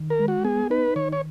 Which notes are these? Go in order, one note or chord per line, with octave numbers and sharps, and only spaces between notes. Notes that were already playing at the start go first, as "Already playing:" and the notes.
Already playing: D#3
A#4
G#3
F#4
B3 G#4
D#4 B4
D#3 C#5
C#5